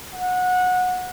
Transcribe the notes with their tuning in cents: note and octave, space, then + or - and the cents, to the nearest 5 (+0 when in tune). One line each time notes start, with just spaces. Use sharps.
F#5 -20